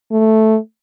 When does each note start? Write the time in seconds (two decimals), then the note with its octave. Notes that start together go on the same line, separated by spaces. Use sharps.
0.12 A3